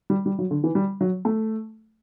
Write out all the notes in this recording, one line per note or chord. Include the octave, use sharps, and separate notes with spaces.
G3
G3
F#3
D3
E3
G3
F#3
A3